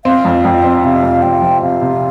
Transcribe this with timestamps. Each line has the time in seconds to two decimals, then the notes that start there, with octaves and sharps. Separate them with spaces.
0.05 C4 F5
0.25 F2
0.45 F2 G5
0.64 C4
0.84 C3 F5
1.03 F2
1.22 F2 G5
1.42 F3
1.62 C3 F5
1.81 C3